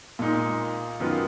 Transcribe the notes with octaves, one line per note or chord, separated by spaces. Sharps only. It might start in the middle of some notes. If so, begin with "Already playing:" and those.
A#2 G#3 D#4
F#2 D#3 G#3 B3 F4